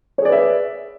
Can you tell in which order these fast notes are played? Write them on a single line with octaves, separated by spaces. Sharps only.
C#5 G#4 D5 B4 E5